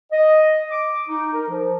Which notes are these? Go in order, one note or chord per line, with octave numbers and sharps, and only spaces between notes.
D#5
D6
D#4
A#4
F3